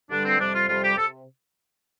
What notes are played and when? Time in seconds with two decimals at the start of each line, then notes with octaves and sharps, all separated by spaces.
0.10 G2 D3 G3 D4
0.24 C4
0.38 F2 C3 G3 D4
0.53 F4
0.67 F2 C3 G3 F4
0.82 G4
0.96 C3 A4